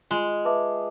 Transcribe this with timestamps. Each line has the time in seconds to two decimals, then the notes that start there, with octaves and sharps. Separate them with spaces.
0.11 G#3 F4
0.45 B4 E5 A5 D6